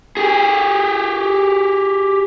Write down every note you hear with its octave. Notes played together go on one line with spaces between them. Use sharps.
G4 G#4